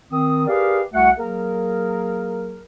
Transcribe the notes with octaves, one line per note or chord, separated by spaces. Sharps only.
D#3 C4 D#6
G4 G#4 A#4 B4 D5 F5
C2 A3 F#4 F#5
F#3 A#3 G#4 A#4